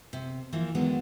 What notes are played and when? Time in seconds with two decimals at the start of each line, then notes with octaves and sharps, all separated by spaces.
0.13 C3
0.52 E3 F3 A#3
0.75 D3 D#3 F#3 G#3 B3